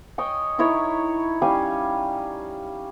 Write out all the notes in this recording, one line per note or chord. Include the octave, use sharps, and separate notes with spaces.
C#5 D#5 G5 G#5
D#4 E4 A#4 C#5
G3 C#4 F5 G#5